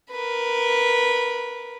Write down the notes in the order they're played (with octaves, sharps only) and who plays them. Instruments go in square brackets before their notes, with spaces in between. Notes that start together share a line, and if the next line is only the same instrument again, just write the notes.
[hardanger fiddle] A#4 B4